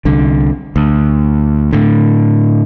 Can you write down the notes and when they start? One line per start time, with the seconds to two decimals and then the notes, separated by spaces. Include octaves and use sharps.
0.05 C2 D3
0.76 D2
1.73 A2 D3